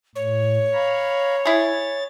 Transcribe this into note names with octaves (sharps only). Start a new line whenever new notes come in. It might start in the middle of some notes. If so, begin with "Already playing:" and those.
A2 C#5
F5 A#5 B5
E4 G#4 A6